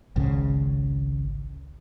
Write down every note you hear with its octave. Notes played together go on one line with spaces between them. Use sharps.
G#1 C#2 C#3